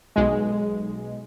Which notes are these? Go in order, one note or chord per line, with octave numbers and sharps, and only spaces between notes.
B1 G#3